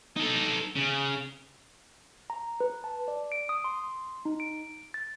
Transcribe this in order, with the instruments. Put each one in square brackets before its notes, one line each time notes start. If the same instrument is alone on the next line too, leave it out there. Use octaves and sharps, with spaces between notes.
[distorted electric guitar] D#4 A4
C#3
[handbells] A#5
B4
A5
D5
D7
D#6
C6
D#4
D7
A6